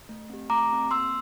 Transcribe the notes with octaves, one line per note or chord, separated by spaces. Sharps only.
A3
C4 G4
A3 A#5 D6
C4 G4
A#3 C6 E6